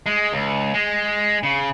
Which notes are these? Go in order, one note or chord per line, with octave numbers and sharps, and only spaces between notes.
G#3
C#2
G#3
C#3